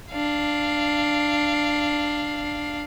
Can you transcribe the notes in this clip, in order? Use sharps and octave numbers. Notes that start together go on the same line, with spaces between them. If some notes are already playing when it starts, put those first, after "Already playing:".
D4 F5